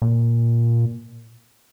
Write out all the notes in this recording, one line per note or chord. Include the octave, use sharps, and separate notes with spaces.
A#2